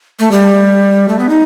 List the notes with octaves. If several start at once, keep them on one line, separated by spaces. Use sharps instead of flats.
A3
G3
A3
B3
D#4